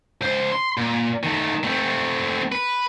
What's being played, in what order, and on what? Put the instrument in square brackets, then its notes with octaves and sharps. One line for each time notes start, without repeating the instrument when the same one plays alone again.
[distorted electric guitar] C#2 C5
C6
A#2
D#3 A3
A3 C4
B4